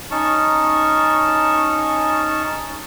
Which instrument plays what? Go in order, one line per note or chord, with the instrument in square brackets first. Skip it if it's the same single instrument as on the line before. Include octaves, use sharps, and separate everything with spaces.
[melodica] C#4 D#4 A5 C#6